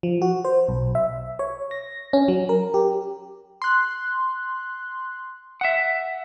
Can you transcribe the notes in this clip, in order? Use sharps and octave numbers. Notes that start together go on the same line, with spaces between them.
F3
F#4
C5
B1
E5
C#5
A#6
C#4
F#3
A#4
G4
C6 F#6
E5 F#5